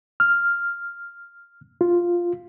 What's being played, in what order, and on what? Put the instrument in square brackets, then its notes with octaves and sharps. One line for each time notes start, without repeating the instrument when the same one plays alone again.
[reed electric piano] F6
F4